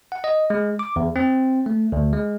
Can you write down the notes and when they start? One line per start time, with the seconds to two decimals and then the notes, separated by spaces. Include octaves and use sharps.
0.12 F#5
0.24 D#5
0.50 G#3
0.79 D6
0.96 E2
1.16 C4
1.66 A3
1.92 D2
2.13 G#3